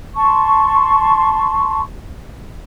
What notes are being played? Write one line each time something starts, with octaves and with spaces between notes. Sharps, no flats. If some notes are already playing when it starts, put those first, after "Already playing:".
A5 C6 C#6